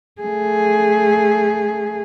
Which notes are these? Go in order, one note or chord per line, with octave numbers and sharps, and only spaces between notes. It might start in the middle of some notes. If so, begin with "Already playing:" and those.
A3 G#4